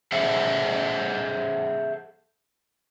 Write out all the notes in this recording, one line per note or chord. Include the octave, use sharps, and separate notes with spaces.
G#4 A4 C5 E5 F#5